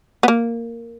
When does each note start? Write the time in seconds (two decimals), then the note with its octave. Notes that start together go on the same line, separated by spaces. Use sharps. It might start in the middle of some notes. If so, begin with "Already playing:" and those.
0.23 B3
0.28 A#3